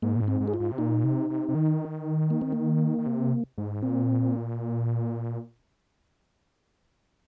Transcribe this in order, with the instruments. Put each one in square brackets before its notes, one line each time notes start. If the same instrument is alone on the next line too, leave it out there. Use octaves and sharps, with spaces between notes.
[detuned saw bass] G#2 [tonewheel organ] A#3
[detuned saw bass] A#2
G#2
[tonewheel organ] C4
[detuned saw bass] G#2
[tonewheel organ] G#4
F4
[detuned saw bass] G#2
C3
[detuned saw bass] A#2 [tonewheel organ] D#4
[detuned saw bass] C3
C3
C3
D#3
[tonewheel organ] A#3
C4
A#3
[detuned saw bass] D#3
C3
G#2
[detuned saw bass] A#2 [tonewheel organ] C4